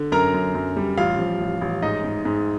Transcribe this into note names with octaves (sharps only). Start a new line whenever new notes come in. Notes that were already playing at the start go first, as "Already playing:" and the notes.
Already playing: D3
F#2 A#4 A#5
F#2
F#2
G3
A1 F4 F5
F3
A1
A1
G#2 D#4 D#5
G#2
G#2